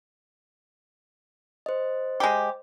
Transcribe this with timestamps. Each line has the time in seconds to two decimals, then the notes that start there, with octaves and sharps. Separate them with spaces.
1.66 C5 D#5
2.20 G#3 G4